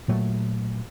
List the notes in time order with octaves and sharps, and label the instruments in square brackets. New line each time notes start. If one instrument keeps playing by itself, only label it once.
[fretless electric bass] A#2 F#3 A3